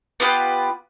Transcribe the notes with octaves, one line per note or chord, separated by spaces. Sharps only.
B3 F4 G4 B4